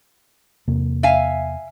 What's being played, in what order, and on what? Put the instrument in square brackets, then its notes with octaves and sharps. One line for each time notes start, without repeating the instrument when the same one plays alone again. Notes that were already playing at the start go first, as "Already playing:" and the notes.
[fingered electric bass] E2 C3 A#3
[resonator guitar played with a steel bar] E5 F5 G#5